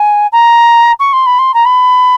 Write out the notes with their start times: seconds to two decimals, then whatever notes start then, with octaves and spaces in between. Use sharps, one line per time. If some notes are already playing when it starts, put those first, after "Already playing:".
Already playing: G#5
0.32 A#5
1.00 C#6
1.13 C6
1.26 B5
1.39 C6
1.54 A#5
1.65 B5